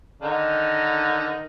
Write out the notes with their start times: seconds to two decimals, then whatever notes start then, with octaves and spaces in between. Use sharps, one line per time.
0.22 D3 D#3 D#4